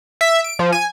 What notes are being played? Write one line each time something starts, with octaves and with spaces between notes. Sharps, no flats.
E5
D7
F3
G#5